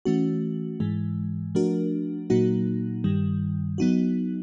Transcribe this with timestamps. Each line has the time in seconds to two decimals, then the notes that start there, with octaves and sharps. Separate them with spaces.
0.05 E3 A3 C#4 F#4
0.80 G#2 E3 G#3
1.55 F3 A3 D4 F#4 A#4
2.30 A#2 F#3 A#3 D#4 F#4
3.04 G2 D#3 G3
3.78 F#3 B3 D#4 F#4